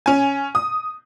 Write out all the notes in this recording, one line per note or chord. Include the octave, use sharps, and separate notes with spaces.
C#4 G#5
D#6